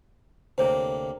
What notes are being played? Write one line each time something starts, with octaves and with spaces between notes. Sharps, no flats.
D2 C3 A#3 C5 C#5